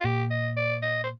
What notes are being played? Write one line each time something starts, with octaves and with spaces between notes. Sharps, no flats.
F4
A#2 G4
D#5
D5
D#5
C5